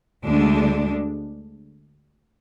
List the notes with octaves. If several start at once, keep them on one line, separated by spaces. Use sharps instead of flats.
D2 D3 G#3 D4